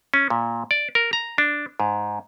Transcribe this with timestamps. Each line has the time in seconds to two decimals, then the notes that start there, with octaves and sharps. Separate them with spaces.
0.14 C#4
0.30 A#2
0.71 D5
0.95 A#4
1.13 A#5
1.38 D4
1.80 G#2